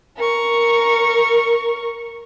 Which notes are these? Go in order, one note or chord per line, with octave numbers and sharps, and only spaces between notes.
A#4 C#6